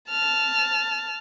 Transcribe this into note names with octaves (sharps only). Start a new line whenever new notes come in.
A5 F6